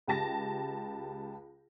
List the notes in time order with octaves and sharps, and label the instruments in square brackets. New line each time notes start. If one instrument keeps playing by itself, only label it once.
[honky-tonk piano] C#2 G4 A5 A#6